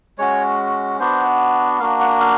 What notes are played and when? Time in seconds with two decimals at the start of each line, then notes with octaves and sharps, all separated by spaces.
0.18 G#3 C#4 F#4 C#5
1.00 B3 D4 F#4 C5
1.80 A#3 D4 F#4 F5
2.00 F#5
2.20 F5